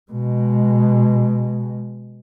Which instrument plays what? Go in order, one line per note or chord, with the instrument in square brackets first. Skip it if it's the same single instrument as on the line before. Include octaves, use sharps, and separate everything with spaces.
[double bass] B2 G#3